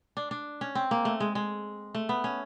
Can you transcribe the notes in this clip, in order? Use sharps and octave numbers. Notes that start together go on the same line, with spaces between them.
D4
D4
C#4
C4
A#3
A3
G#3
G#3
A3
B3
C#4